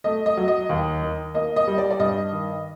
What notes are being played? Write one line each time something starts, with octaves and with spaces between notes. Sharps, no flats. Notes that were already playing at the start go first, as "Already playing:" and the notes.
A3 D#5
D#5
F#3
D#5
D#2
D#3
A#3 D#5
D#5
G3
D5
D5
G2 D#5
D#3